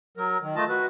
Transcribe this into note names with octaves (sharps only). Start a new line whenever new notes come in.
F#3 A#4
D#3
A3 F4 D#5 A5
F#4 B4